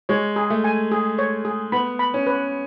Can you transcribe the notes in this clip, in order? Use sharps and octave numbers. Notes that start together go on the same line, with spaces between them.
G#3 C#5
G#4
A3
G#5
G#4
C#5
G#4
B3 B5
B5
C#4
B4